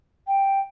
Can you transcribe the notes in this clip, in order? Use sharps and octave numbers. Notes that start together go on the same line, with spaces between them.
G5